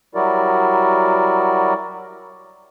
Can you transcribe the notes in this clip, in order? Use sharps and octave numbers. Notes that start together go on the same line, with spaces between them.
F#3 G3 E4 F#4 A#4 D5